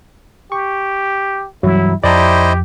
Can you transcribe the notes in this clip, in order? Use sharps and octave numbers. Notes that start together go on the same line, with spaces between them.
G4 C#6
G2 E3 F#3 G3 E4
F2 E4 G4 C5 D5 D#5 A5 A#5